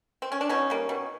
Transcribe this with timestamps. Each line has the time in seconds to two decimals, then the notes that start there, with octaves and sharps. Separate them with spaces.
0.22 C4
0.32 C#4
0.41 D4
0.49 B2 C#4 D#4
0.70 G3 A#3
0.89 B2